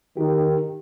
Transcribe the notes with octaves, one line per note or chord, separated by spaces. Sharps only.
D#3 D#4 G4